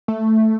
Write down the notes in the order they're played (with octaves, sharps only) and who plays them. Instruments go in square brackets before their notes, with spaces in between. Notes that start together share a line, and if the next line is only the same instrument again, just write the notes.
[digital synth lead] A3